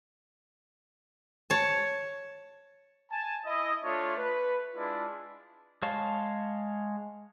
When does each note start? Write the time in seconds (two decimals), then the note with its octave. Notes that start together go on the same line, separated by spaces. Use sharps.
1.50 C#5 A5
3.12 G#5 A5
3.46 E4 D#5
3.84 A3 D4 F4 C#5
4.17 B4
4.75 G#3 D4 E4 F4 D5
5.83 G#3 C#5 F5 A5